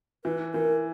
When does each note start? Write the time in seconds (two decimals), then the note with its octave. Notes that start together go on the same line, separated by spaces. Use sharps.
0.24 E3 B4
0.53 E3 A#4